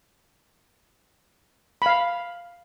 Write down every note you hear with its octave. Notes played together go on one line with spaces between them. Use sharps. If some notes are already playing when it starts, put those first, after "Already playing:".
F5 B5